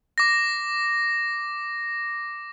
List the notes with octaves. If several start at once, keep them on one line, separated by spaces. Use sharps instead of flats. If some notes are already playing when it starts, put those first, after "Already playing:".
D6 A#6